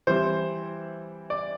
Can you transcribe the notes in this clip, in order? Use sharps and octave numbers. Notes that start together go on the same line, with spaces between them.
E3 G3 C4 C5
D5